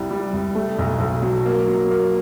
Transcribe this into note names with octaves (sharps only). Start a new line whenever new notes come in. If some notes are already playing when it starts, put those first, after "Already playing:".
Already playing: C2 G3
G3
C2
A3
B1
B1
F#3
A#3
F#3
A#3